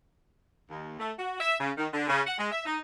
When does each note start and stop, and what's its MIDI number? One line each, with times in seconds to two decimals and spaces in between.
0.71 0.96 39
1.00 1.12 57
1.19 1.38 66
1.40 1.55 76
1.60 1.71 49
1.78 1.88 51
1.94 2.07 50
2.09 2.21 49
2.27 2.36 78
2.39 2.51 56
2.52 2.63 76
2.66 2.79 63